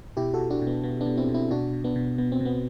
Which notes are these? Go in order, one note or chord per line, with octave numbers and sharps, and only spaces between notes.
B2 E4 G4
F#4 A4
B2
D4 F#4
B2
B3
B2 B3
B3 D4
B2
C4 E4
B2
C4 E4
B2 D4 F#4
B2
B3 D4
B2
B2 B3
C4
B2 B3